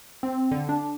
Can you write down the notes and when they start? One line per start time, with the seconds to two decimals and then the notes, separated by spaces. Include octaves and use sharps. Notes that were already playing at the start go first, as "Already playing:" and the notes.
0.23 C4
0.51 D3
0.69 D4